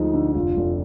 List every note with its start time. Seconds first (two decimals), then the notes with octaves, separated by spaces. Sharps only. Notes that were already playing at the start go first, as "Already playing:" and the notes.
Already playing: D2 F3 G#3 D#4
0.14 D3
0.35 F1 F4
0.57 F1